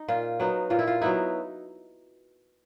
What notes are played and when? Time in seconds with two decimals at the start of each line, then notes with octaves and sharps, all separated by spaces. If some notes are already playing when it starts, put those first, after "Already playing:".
Already playing: D#4
0.08 A#2 F4
0.40 F#3 B3 D#4
0.70 A#2 F4
0.79 E4
0.87 F4
1.01 F#3 B3 D#4 E4